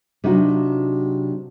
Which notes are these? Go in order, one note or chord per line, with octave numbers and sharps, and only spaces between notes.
C3 F#3 D4 D#4 F4 F#4